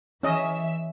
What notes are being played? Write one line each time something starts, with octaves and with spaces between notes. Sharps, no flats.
E3 C#4 D#5 E5